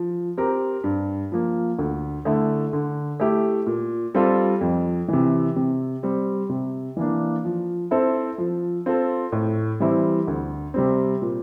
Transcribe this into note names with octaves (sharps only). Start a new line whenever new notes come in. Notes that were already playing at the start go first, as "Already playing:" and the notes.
Already playing: F3
C4 G4 A#4
G2
F3 A#3
D2
D3 A3 E4
D3
A3 E4 G4
A#2
G3 C4 F4 A4
F2
C3 E3
C3
G3 C4
C3
E3 A#3 D4
F3
C4 E4 A4 C5
F3
C4 F4 A4
A2
E3 G3 C4 E4
D2
C3 G3 C4
A#2